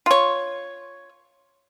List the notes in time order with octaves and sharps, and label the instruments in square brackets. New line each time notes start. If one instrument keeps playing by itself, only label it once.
[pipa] F4 C#5